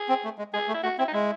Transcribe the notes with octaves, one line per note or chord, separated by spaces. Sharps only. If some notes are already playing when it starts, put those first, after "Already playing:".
Already playing: G#4
C4
A3
G#3
G#3 G#4
A3
E4
A3 F#4
C4 E4
D#4
G#3 E4